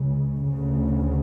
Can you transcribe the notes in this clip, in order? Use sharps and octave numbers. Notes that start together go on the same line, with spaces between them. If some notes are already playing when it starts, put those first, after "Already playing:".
Already playing: C#2 C#3
D2 C#3